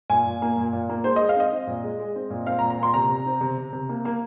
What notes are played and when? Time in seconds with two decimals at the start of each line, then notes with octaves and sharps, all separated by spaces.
0.10 A#2 G#5
0.26 A#2
0.42 A#3
0.57 A#2
0.73 A#2
0.89 A#3
1.04 G#3 C5
1.16 G#3 D#5
1.29 F5
1.36 C4 D#5
1.52 C4
1.67 A#2
1.84 G#3
1.99 G#3
2.16 C4
2.30 A#2
2.47 C4 F5
2.59 A#5
2.62 A#2
2.70 A#5
2.78 A#2
2.83 C6
2.94 C3 A#5
3.09 C3
3.26 C4
3.41 C3
3.58 C3
3.73 C3
3.89 A#3
4.05 A#3